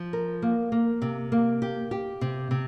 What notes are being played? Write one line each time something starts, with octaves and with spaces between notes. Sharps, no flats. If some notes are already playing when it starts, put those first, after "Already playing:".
Already playing: F3
A#4
A#3
A#3
C3
A#3
G4
G4
C3
C3